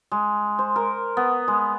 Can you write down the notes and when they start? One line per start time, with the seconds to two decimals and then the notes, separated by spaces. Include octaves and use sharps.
0.12 G#3
0.59 C5
0.76 A#4
1.17 B3
1.48 G#3